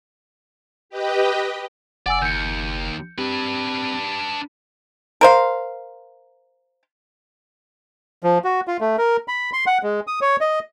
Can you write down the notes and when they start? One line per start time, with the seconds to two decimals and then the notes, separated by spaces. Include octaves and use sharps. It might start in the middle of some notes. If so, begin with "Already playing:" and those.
0.89 G4 B4 D#5 G5
2.06 F#1 D5 F#5 G#5 E6
2.22 D#2 G6 C#7
3.18 C4 D4 G4 B4
5.21 A#4 C5 F5
8.23 F3
8.44 F#4
8.67 F4
8.81 A3
8.98 A#4
9.28 B5
9.53 C6
9.67 F#5
9.83 G#3
10.07 D#6
10.21 C#5
10.41 D#5